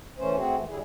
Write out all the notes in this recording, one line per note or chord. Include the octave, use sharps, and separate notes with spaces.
E3 A3 C#4 C5
A3 C4 F#4 G#4
E3 A3
A2 D3 G3 E4 G#4